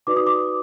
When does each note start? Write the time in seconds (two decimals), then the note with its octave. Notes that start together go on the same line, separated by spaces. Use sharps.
0.07 D#4 F#4 B4 D5 D6
0.16 D#6
0.27 D6